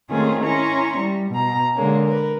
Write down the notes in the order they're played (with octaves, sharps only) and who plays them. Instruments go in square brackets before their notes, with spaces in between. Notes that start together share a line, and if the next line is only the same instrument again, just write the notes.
[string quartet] D#3 A3 C4 C#4 F4 G#4
C#4 E4 A#5 C6 C#6
G3
B2 A#5
D3 G#3 A#3 C#4
A#4 B4